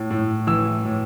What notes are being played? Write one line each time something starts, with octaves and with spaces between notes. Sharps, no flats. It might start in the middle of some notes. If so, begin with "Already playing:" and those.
Already playing: A2
A2
E3 E6
A2